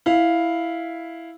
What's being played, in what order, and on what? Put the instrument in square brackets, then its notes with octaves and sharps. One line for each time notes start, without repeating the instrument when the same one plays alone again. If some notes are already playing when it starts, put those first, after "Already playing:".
[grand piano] E4 F5